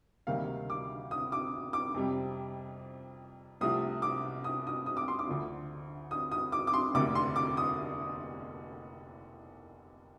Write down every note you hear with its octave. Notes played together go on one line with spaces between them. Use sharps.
D2 C3 D#3 G3 A#3 F5
D6
D#6
D6
D6
F2 C3 G3
C2 C3 F3 A3 D#6
D6
D#6
D#6
D#6
D6
C6
D6
D2 D3 F3
D#6
D#6
D6
D6
C6
F1 D#2 D3 A3 D6
C6
D6
D#6